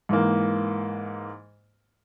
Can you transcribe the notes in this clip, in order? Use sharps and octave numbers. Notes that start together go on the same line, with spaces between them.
G#2 E3 A#3